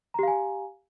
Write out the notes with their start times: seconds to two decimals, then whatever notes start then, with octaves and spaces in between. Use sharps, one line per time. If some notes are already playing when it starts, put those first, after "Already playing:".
0.14 A#5
0.19 G4
0.23 F5
0.28 G#5